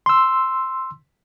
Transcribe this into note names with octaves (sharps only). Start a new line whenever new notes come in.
C6 E6